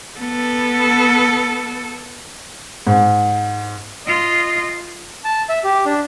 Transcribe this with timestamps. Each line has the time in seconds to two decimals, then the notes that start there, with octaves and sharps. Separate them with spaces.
0.19 B3 A4
2.87 G#2
4.07 F4 D#5
5.24 A5
5.49 E5
5.64 G4
5.86 D4